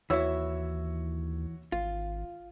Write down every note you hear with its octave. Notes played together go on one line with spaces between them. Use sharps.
D#2 E3 E4 F#4 C#5 E6
G#1 F4